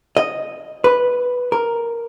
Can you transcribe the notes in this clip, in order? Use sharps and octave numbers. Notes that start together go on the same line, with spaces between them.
D#5
B4
A#4